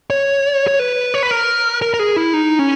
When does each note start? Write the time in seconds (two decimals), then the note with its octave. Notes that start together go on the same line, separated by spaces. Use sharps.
0.10 C#5
0.68 C#5
0.79 B4
1.14 C#5
1.23 B4
1.31 A#4
1.82 A#4
1.94 A#4
1.99 G#4
2.16 E4
2.34 D#4
2.59 C#4